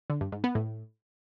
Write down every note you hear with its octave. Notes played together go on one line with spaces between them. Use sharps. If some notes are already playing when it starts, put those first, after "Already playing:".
D3
G2
G#2
B3
A2